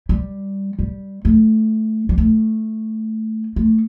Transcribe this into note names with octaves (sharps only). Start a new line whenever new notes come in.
G3
G3
A3
G3
A3
A3